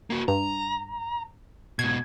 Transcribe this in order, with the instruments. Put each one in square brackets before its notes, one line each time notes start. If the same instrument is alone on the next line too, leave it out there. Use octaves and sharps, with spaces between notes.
[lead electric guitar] A#3 F#4
[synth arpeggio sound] G2 [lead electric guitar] A#5
[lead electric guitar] G#2 B2 [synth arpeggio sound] G#6